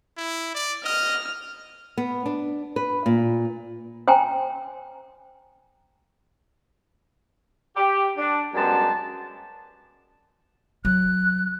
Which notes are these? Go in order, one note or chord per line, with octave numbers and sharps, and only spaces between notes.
E4
D5
D#5 F6
B3
D4
B4
A#2
C5 G5 G#5 A#5
G4
D4
F#2 G3 G#3 B3 G4 A5
F#3 F#6